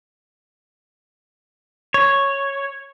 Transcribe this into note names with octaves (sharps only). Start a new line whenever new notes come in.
C#5